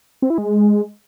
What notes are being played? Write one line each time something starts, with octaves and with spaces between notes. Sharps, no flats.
C4
E4
G#3